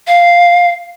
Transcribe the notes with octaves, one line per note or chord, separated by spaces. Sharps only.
F5